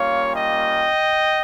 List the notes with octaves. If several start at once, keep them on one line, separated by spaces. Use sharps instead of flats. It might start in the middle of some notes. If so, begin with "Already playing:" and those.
Already playing: G3 A#3 C#4 F4 C#5 F5
D#5 G5